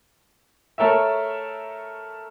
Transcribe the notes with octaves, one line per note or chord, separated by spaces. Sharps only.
A3 A4 A#4 C#5 E5